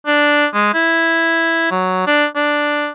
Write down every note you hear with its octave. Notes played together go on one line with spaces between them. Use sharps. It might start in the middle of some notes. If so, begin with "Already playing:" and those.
D4
G#3
E4
F#3
D4
D4